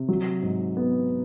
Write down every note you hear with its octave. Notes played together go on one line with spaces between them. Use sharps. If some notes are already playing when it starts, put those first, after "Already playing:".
Already playing: C3
F#3
G#2
B3